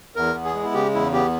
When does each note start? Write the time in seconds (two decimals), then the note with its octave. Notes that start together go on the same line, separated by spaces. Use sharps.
0.16 E2 A#4
0.35 B3
0.45 G#4
0.55 G#3
0.64 E4
0.74 C#3 G4
0.93 E2 E4
1.13 B3 G4